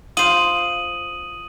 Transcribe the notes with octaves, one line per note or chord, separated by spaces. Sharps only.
F4 C5 D#6 D#7 F#7